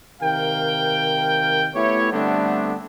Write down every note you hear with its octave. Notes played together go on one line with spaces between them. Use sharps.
C3 D#3 A#4 F5 G5
A3 B3 E4 G4 C#5
D3 G3 A3 B3 C4 D4